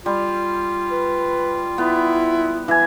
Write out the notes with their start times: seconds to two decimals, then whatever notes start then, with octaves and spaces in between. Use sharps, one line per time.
0.06 G3 F4
0.91 B4
1.78 B3 E4
2.68 E3 G#5